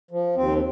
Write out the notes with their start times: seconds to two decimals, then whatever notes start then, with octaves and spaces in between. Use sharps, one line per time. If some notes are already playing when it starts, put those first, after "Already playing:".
0.11 F3
0.36 D#2 C4